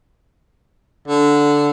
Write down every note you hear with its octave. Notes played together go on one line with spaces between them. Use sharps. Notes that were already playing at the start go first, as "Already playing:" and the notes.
D3